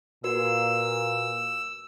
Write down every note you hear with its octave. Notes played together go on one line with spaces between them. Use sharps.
A#2 F#4 A#4 B4 E6